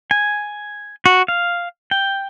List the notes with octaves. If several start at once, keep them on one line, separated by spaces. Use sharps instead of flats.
G#5
F#4
F5
G5